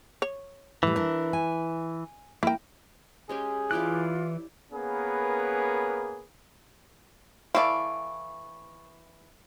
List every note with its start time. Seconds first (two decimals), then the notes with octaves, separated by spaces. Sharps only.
0.22 C#5
0.83 A2 E3 G3
0.96 D4 E4 A#4
1.33 G#5
2.43 A#3 E4 G5
3.29 G#3 C#4 G4 G#4
3.71 E3 E4 F4 G4 D5 D6 F#6
4.73 A#3 B3 C#4 G#4 A#4 B4
7.55 E3 E4 A4 D5 F5 C#6